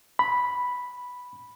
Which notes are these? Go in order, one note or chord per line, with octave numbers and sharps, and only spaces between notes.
B5